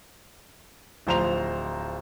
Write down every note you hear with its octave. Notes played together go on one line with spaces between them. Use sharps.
D1 F3 C5 A#5 F7